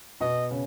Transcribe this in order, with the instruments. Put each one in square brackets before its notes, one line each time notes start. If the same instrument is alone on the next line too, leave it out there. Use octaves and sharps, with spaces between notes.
[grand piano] B2 B3 [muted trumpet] D#5
[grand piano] C#3